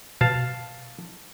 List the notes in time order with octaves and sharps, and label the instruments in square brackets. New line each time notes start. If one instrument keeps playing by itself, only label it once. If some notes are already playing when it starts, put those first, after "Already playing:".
[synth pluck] B2 [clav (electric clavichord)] F5 A5